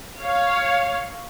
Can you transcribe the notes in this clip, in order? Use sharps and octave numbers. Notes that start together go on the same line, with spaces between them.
C#5 F5